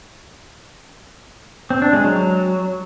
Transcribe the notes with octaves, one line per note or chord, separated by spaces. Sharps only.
C4
D4
G#3
F#3